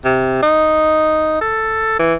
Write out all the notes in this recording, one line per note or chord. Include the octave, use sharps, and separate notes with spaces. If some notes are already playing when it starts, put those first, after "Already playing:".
C3
D#4
A4
E3